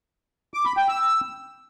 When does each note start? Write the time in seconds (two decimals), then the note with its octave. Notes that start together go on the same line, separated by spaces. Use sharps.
0.54 D6
0.65 B5
0.77 G5
0.88 E6